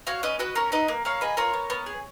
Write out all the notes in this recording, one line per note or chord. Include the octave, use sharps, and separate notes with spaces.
F#4 C#5 F5
C#4 B4 D#5
F#4 B4 D#5
C#4 A#4 C#5
D#4 B4 D#5
A#3
A#3 C#5 F5
G#4 B4 D#5
F4 A#4 C#5
B3
B3
G#4